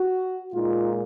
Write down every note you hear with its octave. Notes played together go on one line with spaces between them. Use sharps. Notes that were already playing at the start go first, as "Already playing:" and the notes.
Already playing: F#4
A#2 G#3 D#4 F4